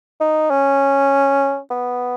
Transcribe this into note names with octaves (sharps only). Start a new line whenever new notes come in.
D#4
C#4
B3